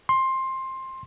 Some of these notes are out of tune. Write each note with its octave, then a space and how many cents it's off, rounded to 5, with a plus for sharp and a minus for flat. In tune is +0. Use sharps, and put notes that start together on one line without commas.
C6 +15